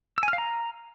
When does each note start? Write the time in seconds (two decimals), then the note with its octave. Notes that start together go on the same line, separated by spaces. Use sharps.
0.18 E6
0.23 G#5
0.28 F6
0.33 F5
0.38 A#5